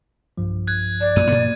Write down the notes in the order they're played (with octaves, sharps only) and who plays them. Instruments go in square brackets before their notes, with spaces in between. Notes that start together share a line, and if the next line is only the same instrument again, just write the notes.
[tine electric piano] B1 G2 F3
[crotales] F#6 G#6
[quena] D5
[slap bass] F#2 A#2 [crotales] D#7
[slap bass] A#2 A#3 B3